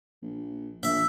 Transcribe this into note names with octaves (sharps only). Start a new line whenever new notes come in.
A#1
A#1 E5